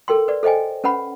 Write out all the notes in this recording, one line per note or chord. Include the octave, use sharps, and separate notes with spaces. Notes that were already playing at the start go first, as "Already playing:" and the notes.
A4 A#4 G5 C6
B4 D5
A4 C5 D#5 G5 G#5
C#4 B4 F#5 B5